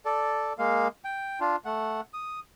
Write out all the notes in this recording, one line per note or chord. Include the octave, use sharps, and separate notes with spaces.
A4 D5
G#3 A#3 F5
G5
D4 F4
A3 F#5
D#6